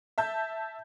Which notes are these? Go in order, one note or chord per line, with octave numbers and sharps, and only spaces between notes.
E5 A5 G6